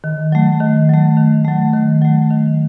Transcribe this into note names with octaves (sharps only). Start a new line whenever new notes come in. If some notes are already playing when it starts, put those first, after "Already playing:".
D#3
F#3 A3
D#3
F#3 A3
D#3
F#3 A3
D#3
F#3 A3
D#3